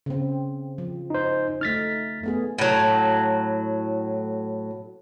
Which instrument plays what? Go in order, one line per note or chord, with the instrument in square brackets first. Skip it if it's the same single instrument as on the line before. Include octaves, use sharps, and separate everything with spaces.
[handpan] C#3 C4
F3
[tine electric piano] D#4 C5
[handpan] A3 D#4 [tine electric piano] F6 A6 B6
[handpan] A3 B3 G#4
[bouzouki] A2 F#3